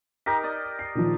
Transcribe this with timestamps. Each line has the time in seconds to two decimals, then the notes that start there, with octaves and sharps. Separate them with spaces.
0.26 D#4 G4 A#4 A#6 B6
0.43 D5 D#5
0.79 C7
0.95 A#2 D#3 F3